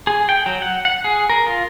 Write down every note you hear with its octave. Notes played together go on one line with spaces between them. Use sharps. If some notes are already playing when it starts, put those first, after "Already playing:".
G#4
G5
F#3
F#5
F#5
G#4
A#4
F4